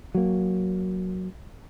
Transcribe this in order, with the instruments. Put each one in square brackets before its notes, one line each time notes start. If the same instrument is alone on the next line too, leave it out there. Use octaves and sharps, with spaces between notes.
[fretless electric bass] F#3 A#3